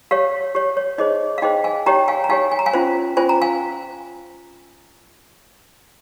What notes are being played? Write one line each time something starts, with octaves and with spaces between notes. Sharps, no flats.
G4 C#5 F5
G4 C#5
C#5
D#4 G#4 C5 D#5
F5
D#4 G#4 C5 D#5 G5
F5 G#5
D#4 G4 C#5 G5 A#5
F5 G#5
A#5
D#4 G4 C#5 F5 G#5
G#5
A#5
F5 G#5
C#4 F4 C5
C#4 F4 C5 G#5
A#5
F5 G#5